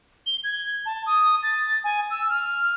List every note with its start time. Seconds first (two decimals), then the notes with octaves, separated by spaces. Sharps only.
0.26 G7
0.44 G#6
0.86 A5
1.06 D#6
1.43 A6
1.84 G#5
2.11 E6
2.29 F6